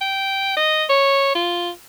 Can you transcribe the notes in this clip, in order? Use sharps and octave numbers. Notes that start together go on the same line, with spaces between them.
G5
D#5
C#5
F4